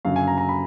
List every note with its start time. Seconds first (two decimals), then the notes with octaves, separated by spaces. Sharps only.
0.05 F#1 F#2 D3 F#3 F5
0.16 G#5
0.28 A#5
0.38 A#5
0.49 B5